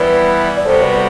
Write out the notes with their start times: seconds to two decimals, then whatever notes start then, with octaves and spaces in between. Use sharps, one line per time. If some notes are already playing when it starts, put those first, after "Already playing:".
Already playing: E3 G3 B3 E4 B4 D5
0.57 D5
0.65 C3 G3 B3 F#4 A4 C5
0.80 B4 D5